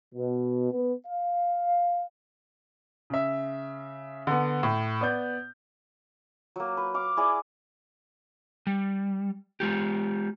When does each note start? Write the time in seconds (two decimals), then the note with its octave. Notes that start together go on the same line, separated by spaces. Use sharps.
0.14 B2
0.72 B3
1.07 F5
3.10 C#3 E5
4.27 D3 B3
4.63 A2
5.01 B3 D5 G6
6.56 F#3 A#3
6.77 B4
6.94 F5 D6
7.17 E4 G#4 D5
8.67 G3
9.60 G#3 F4 G4